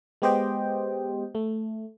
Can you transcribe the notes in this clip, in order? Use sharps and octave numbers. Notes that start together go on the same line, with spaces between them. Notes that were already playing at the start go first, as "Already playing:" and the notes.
G#3 B3 G4 C5 D#5 G5
A3